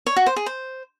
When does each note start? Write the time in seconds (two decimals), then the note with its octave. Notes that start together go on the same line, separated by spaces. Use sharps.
0.06 C#5
0.16 F#4
0.26 C5
0.36 G#4
0.46 C5